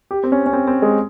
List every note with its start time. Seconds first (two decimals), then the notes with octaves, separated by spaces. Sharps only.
0.11 G4
0.23 C4
0.32 C#4
0.46 C#4
0.53 C4
0.67 C4
0.82 G#3